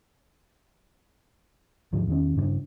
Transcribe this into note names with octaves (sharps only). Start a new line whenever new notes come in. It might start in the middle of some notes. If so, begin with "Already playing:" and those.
D#2 G#2 D3 F3
E2 D#3 C#4
G2 C#3 C#4 D4